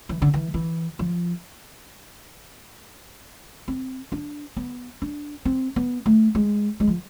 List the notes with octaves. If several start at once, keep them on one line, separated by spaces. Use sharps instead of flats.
E3
D3
E3
E3
F3
C4
D4
B3
D4
C4
B3
A3
G#3
G#3
F3